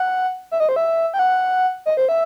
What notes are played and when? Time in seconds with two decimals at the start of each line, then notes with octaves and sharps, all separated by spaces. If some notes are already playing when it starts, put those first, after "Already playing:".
Already playing: F#5
0.52 E5
0.60 D#5
0.69 C5
0.76 E5
1.14 G5
1.19 F#5
1.86 D#5
1.97 C5
2.09 E5